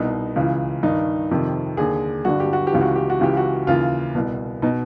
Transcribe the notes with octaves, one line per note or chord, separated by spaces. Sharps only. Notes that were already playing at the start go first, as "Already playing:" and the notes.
Already playing: C2 B2 D#4
C#2 C#3 E3
G2 D#3 D#4
F2 C3 D#3
D#2 D3 G#4
G2 D3 F#4
G4
F#4
G4
C#2 C#3 E3
F#4
G4
F#4
C#2 C#3 E3 G4
F#4
D#2 C#3 E3 F4
C2 B2
B2 D#4